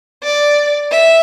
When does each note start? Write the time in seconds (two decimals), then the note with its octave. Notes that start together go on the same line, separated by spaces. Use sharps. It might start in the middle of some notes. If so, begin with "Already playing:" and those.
0.23 D5
0.92 E5